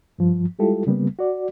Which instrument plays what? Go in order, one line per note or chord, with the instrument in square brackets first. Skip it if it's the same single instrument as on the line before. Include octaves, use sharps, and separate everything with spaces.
[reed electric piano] G2 F3
G3 G#3 E4 F4 G4 A4
C#3 G3 A#3 B3
F#4 D5